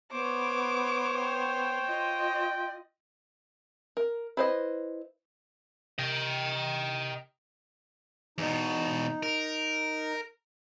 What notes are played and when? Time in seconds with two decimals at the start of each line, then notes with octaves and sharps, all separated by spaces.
0.12 B3 C5 C#5 D6
1.17 G5
1.87 F4 D#5
3.97 A#4
4.37 E4 B4 C5 D5 D#5
5.99 C3 D#5 G5
8.38 E2 B2 D#4
9.23 A#4